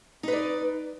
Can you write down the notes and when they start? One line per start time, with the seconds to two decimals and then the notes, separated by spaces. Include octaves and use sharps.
0.23 D#4
0.28 B4
0.32 D5